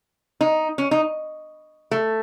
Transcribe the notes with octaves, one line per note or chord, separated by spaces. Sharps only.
D#4
C#4
D#4
A3